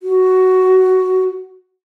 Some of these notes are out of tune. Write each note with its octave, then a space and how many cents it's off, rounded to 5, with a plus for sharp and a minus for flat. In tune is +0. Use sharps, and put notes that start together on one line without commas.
F#4 +10